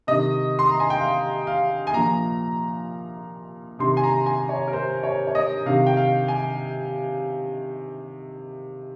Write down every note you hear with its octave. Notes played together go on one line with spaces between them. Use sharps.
C3 D#3 D#5
C6
A#5
G#5
G5
F5
F5
G#5
A#2 F3 A#5
C3 D#3 C6
G#5
A#5
G#5
C#5
A#4
C5
C#5
C#5
D#5
C3 D#3 F5
G5
F5
G#5